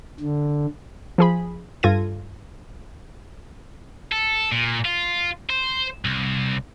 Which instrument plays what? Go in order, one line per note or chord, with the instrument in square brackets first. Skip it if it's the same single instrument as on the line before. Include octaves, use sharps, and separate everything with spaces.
[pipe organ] D3
[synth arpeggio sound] F3 G#4 B5
G2 F4 A4 G#6 A#6 D#7
[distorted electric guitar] A4
A#2
F4
C5
C2